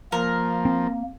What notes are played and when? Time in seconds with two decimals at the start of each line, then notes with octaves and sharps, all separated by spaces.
0.12 F3 A#3 A#4
0.65 C4